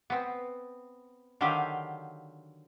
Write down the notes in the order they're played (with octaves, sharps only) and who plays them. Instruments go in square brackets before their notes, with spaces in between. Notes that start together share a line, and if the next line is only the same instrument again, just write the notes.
[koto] B3 C4
D3 D#3 F#3 G4 F5